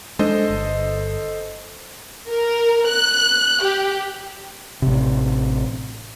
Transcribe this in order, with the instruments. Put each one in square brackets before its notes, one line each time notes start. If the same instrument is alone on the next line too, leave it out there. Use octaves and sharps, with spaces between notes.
[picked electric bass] G#3 D4 [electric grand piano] A4 C5 D#5
[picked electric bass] G1
[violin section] A#4
F#6
G4
[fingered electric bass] A1 C3